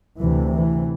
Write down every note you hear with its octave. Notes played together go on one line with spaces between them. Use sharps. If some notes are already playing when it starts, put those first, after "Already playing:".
D2 C3 E3
E3